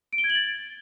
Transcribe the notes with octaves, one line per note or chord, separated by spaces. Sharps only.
D7
G7
G#6
F#7
A6